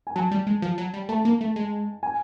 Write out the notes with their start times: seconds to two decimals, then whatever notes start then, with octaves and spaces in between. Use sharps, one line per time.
0.07 G#5
0.15 F#3 A5
0.31 G3
0.47 G#3
0.62 F3
0.78 F#3
0.94 G3
1.09 A3 A5
1.25 A#3
1.41 A3
1.56 G#3
2.03 G#5